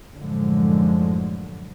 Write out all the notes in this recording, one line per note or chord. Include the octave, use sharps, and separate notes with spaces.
F#2 A2 D3 F3 F#3 G#3